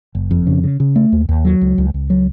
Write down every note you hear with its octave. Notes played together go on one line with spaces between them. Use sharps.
F#1
F2
C#3
C#3
C#3
A3
D#2
D#2
F#3
C#2
C#2
C#2
F#3